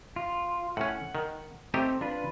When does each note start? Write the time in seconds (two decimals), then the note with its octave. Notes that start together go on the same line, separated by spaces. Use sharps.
0.16 F4
0.77 A2 C#4 F#5
1.15 D#3
1.74 A3 C4 D#4 G4
2.01 D4 F4 B4